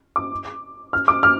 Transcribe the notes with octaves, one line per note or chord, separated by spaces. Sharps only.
D6
F6
D6
F6